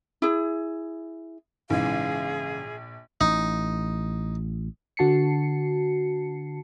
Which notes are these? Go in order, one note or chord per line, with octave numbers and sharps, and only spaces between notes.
E4 G#4
A#1 G#2 C#3 E3 G#4 F5
A1 D#4
D3 F#4 A5 C7 C#7